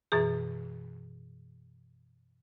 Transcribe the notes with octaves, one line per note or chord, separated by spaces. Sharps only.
F#2 B2 E3 G#4